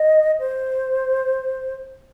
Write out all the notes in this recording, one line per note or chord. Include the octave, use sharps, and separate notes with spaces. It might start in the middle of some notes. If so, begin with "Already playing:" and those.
Already playing: D#5
C5